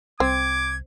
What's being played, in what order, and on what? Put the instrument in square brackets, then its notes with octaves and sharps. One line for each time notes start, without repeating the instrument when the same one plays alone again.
[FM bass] C2 [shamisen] C4 [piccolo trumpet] D6 [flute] G#6